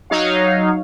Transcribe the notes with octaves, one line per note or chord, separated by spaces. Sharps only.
F#3 D#4 C#5 F5